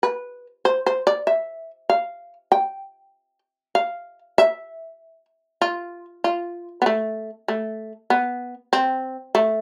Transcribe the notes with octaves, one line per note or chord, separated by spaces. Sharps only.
B4
C5
C5
D5
E5
F5
G5
F5
E5
F4
F4
B3
A3
A3
B3
C4
A3